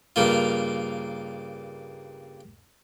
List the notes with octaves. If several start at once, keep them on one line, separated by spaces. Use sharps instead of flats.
G2 C#3 A#3 F4